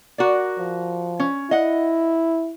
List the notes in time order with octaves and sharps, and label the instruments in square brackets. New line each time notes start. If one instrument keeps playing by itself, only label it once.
[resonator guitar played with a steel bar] F#4 A#4 D5
[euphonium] F3
[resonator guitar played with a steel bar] C#4
[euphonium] E4 [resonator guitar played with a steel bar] D#5 F#5